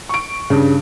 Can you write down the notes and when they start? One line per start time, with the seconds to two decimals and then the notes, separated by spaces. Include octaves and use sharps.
0.09 C#6 D7
0.50 G2 C#3